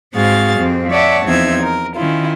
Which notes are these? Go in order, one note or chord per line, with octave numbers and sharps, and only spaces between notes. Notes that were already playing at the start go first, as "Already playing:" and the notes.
G#2 C4 F#4 G#4 F5 A6
F2 C4
C#5 D5 E5 F#5 A5
E2 F3 C4 D#4 E5 G#6
A#4
D#3 C#4 E4 F4